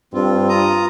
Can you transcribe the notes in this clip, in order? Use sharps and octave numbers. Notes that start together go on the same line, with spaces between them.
G2 C4 F4
F4 A#5 D#6